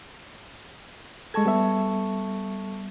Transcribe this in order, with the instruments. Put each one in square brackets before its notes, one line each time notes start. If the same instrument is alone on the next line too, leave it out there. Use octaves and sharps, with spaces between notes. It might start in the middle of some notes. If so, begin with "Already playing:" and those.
[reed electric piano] G#3 G#6 [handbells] A4 A5 C#6
[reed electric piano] G3 B3 E5